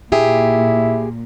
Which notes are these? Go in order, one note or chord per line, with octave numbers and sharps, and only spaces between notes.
A#2 E4 G4 G#4